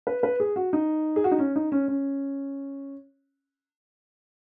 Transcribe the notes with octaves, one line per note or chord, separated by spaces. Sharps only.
B4
B4
G#4
F#4
D#4
G#4
F#4
D#4
C#4
D#4
C#4
C#4